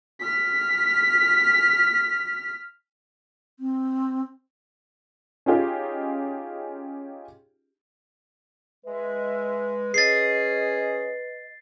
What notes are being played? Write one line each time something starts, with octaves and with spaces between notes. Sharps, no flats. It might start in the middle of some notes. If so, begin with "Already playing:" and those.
F6 B6
C4
C#4 D#4 F4 G4 G#4
G#3 B4 E5
C#4 G#4 D#5 A6 C7